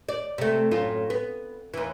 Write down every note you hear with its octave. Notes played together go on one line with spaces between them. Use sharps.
D5
C3 A3
F#2 A2 F4
B3
D#2 E3